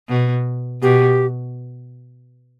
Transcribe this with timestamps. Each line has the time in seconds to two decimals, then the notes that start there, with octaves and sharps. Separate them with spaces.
0.09 B2
0.82 B2 G4